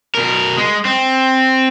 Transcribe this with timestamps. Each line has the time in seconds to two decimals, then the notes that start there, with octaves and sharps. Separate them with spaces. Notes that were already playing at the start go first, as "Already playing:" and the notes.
0.15 B2 A#4
0.57 G#3
0.85 C4